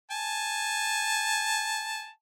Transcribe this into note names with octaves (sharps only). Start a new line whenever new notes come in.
G#5 A5